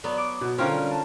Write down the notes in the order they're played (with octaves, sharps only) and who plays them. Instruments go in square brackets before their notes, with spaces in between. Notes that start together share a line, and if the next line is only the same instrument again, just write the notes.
[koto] F#3 B3 [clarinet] D5
[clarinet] D6
[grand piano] B2 [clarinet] B3
[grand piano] D3 F4 C5 [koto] C#4 A#4 [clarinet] G5
[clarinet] G3
A5